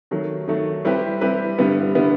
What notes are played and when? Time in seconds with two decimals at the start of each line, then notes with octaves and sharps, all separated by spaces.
0.11 D#3 F#3 A3
0.48 D#3 F#3 A3
0.85 G3 C4 E4 G4 B4
1.21 G3 C4 E4 G4 B4
1.58 G2 D3 G3 B3 E4
1.95 D3 G3 B3 E4